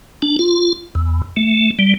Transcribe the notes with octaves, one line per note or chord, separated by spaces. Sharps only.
D4
F4
E2
A3
G3